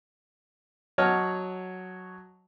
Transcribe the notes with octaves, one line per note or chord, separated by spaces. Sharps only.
F#3 C#5 D#5 F#5 A5 F6